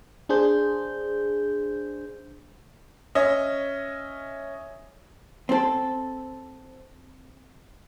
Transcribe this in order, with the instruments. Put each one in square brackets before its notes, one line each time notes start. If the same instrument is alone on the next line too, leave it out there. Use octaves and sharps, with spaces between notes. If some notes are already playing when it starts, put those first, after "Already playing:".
[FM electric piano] D4 G#4 C5 G6
[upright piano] C#4 D#5 E5
[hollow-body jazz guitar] C4 A4